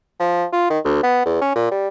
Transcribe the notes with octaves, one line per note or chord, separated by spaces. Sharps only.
F3
F4
D#3
D2
B3
E2
C#4
A#2
G3